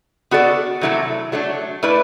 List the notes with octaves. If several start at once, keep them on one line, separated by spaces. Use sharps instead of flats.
B3 F#4 A4 D5
C3 F#3 A3 E4 A4
F#3 A3 D4
A3 E4 B4 D5